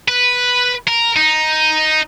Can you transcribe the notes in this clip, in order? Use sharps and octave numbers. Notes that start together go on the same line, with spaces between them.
B4
A#4
D#4